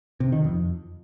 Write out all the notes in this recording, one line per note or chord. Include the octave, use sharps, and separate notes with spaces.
C3
D#3
F2